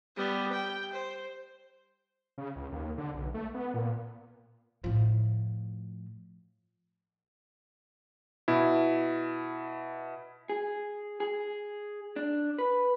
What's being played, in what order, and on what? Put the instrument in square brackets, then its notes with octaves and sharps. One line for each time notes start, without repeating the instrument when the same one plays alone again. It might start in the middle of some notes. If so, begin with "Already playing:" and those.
[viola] G3 B3
G5
C5
[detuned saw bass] C#3
C#2
D#2
D3
B1
A3
B3
A#2
[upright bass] A2 F3
[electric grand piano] B2 E4
[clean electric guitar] G#4
G#4
D4
B4